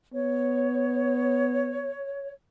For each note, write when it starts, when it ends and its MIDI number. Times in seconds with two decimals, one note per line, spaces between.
0.13 1.95 59
0.13 2.32 73